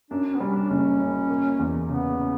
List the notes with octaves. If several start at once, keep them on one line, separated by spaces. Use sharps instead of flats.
F#2 D4
D4
B3
G3 C#4
D4
F#1 C#4
F#2
A#3
E2
C#3 B3
C#3